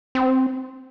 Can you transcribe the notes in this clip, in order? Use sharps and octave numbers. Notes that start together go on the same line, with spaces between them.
C4